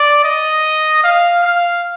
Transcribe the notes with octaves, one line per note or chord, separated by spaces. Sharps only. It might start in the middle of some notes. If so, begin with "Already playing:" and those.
Already playing: D5
D#5
F5
F5